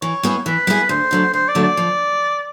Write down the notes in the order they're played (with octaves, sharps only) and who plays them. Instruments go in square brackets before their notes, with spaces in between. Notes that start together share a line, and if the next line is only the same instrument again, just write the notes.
[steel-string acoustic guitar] E3 [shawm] C#5
[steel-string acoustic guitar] G3 B3 E4 G#4
[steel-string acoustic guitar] E3 [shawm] B4
[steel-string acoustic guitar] G3 B3 E4 G#4
[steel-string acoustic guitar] D2 [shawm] C5
[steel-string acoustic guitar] D3 F#3 A3
[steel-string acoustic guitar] D2 [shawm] C5
[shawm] D5
[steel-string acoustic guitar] D3 F#3 A3
[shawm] D5
[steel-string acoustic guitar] F3